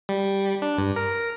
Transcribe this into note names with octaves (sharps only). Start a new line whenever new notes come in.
G3
D4
G2
A#4